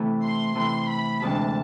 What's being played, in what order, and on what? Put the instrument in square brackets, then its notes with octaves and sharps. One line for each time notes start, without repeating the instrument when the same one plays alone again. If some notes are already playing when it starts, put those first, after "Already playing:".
Already playing: [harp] C3 E3 A3 E4 A4
[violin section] C6
[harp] C3 E3 A3 E4 A4 [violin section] C6
[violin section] B5
[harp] D2 C3 E3 G#3 D4 [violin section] A5